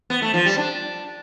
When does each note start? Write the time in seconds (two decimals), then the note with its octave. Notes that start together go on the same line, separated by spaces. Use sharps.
0.10 B3
0.22 A3
0.34 F3
0.46 G3
0.57 D4